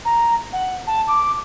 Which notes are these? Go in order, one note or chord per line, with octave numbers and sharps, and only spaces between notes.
A#5
F#5
A5
D6